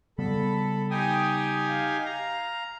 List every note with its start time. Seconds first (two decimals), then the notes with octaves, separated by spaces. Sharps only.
0.18 C#3 G3 B3 A4 B5
0.91 D#4 G4 G5 G#5 D#6
1.68 F5
2.06 A#5